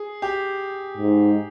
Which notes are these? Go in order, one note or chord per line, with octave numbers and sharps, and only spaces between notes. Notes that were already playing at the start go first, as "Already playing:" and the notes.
Already playing: G#4
G4
G#2